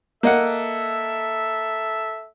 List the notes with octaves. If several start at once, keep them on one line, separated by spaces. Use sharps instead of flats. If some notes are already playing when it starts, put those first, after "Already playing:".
A#3 A4 D#5 E5 F#5